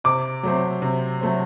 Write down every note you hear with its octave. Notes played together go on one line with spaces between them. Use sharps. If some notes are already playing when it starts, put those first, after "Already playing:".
C3 D6
F#3 A3 C4
C3
F#3 A3 C4